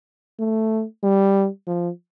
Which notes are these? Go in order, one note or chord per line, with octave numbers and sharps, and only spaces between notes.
A3
G3
F3